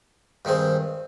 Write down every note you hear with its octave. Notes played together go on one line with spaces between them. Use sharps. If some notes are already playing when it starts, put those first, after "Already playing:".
G2 D#3 G#3 C4